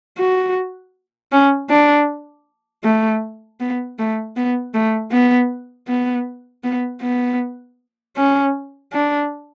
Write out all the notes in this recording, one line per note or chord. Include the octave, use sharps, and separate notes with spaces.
F#4
C#4
D4
A3
B3
A3
B3
A3
B3
B3
B3
B3
C#4
D4